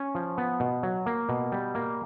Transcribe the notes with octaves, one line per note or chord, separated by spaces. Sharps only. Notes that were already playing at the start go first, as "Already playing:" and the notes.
Already playing: C#4
F3
B3
B2
F#3
A#3
B2
G3
A#3